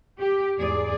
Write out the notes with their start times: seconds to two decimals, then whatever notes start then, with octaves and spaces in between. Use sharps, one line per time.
0.19 G4
0.58 E2 G#2 G#4 D5